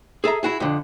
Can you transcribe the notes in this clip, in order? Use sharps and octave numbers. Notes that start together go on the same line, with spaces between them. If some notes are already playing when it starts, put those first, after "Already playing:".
G#4 A4 E5 A#5
E4 F#4 G#4
F2 D3